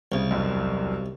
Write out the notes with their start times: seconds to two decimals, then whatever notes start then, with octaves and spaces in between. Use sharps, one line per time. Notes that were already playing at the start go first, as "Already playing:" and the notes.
0.12 C2 C#3
0.31 E1 B1 F#2